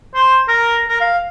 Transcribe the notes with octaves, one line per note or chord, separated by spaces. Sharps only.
C5
A#4
A#4
F5